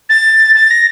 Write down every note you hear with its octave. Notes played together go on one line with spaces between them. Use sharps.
A6
A6
A#6